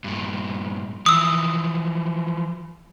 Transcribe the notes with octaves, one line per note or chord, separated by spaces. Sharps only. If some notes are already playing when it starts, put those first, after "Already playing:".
G2 A#2
E3 F3 D#6 E6